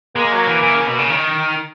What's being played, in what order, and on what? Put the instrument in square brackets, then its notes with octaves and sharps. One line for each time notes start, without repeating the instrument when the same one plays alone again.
[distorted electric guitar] G#3 [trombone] A#3
[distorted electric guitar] F#3
E3
E3
C#3
B2
C#3
D#3